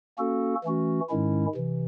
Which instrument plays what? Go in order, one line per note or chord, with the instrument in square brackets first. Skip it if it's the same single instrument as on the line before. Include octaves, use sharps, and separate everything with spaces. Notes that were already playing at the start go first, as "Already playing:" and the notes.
[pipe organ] A#3 C#4 F#4 A4
E3 A3 C#4 F#4
G#2 D#3 G#3 C#4 E4
C3 E3